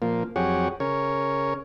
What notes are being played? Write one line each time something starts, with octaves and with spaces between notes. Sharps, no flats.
A#2 F3 A#3
F2 F#3 G4 G#4 C#5 F#5
C#3 A#4 C#5